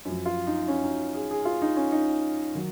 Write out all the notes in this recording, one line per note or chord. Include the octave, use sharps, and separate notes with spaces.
F#2 F3
F4
D#4
C#4
D#4
G#4
G#4
F4
D#4
C#4
D#4
D#3 F#3